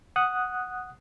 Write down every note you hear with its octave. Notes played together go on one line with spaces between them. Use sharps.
F#5 D#6 F#6